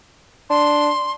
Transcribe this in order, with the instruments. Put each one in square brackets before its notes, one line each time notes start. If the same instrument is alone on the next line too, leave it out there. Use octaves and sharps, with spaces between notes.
[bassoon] D4 [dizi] C6